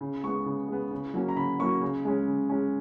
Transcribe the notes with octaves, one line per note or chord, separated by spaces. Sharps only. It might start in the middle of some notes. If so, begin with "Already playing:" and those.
C#3
G#3 B3 C#6
C#3
G#3 B3
C#3
F#3 A#3 C#4
A#5
C#3 B5
F#3 A#3 C#4 C#6
C#3
G#3 C#4
C#3
G#3 C#4